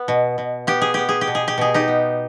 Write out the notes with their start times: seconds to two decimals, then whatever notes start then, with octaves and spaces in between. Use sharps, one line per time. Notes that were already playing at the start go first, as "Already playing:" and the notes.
Already playing: B3
0.08 B2
0.38 B2
0.67 B3 G4
0.81 G#4
0.94 B3 G4
1.09 G#4
1.21 G4
1.27 B2
1.35 G#4
1.48 G4
1.58 B2 G#4
1.74 D#4 G4
1.88 B3